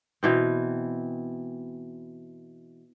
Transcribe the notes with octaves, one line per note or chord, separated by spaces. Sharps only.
B2 E3 C4